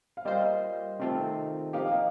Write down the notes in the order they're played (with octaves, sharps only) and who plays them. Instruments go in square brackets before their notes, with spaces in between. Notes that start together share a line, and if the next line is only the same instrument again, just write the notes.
[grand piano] F5
[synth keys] G3 A#3 F4 C5 [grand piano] D#5
[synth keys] C3 D#3 A3 C4 F4
[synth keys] C3 F3 A#3 D#4 G4 [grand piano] F5
[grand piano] D#5
F5